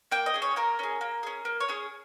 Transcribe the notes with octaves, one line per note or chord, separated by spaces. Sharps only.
A#3 G5
D#5
C#4 G#4
C#5
A#3 A#4
C#4 G#4
A#3
C#4 G#4
A#3
C#5
C#4 G#4